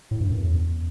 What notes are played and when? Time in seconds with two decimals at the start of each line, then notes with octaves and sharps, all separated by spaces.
0.11 A2
0.21 G2
0.30 F#2
0.39 E2